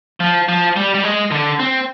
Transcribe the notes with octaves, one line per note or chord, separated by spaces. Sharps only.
F3
F3
G3
G3
G#3
D3
C4